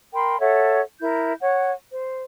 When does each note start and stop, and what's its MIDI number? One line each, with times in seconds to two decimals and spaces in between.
0.13 0.39 70
0.13 0.39 79
0.13 0.39 83
0.13 0.39 84
0.40 0.80 69
0.40 0.80 73
0.40 0.80 76
0.40 0.80 78
1.00 1.32 64
1.00 1.32 70
1.00 1.32 91
1.41 1.71 73
1.41 1.71 78
1.90 2.21 72